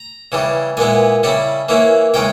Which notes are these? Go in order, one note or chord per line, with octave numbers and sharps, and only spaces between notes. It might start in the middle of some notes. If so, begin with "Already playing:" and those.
Already playing: A#5
C#3 E3 G3
A#2 G#3 B3 E4 G#5
C#3 G3 C#4 E4
E3 A#3 C#4 E4
C#3 E3 G#3 C#4 G5